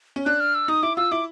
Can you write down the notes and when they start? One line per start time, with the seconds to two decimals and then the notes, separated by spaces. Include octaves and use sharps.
0.16 C#4
0.26 D4 F#6
0.40 F6
0.55 E6
0.68 D#4 D#6
0.83 E4 D6
0.97 F4 E6
1.11 E4 D6